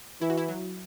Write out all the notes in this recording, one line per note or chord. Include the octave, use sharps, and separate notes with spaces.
E3 E4
F#4
E4
F#3